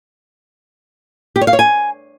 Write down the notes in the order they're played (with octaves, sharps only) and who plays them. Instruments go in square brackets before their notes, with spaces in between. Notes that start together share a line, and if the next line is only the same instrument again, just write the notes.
[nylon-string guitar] G4
C#5
F5
C#5
G#5